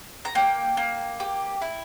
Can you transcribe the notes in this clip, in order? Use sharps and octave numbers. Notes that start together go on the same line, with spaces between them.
A#5
A#3 G5
A#3
G4
E4